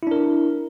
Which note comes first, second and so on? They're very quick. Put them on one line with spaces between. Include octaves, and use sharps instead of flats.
E4 D4 A#4